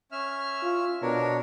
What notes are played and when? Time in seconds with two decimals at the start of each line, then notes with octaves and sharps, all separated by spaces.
0.12 C#4 E5 F6
0.63 F4
1.02 B2 D4 A#4 C#5